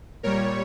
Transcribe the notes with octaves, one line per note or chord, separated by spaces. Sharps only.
A#2 G3 A#4 C#5